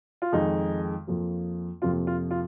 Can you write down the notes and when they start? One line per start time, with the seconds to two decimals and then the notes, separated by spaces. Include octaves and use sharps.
0.22 F4
0.33 F2 D#3 G#3 D#4
1.07 F2 F3 A#3
1.82 F2 C3 F3 A#3 F4
2.07 F4
2.31 F4